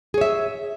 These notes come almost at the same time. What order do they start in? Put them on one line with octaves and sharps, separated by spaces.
G#4 C#5 E5